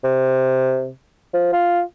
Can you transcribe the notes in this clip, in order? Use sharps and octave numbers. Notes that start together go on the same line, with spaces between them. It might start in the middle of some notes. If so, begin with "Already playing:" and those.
C3
F3
F4